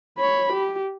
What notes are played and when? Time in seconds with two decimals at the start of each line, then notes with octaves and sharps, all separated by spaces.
0.18 C#5 B5
0.53 G4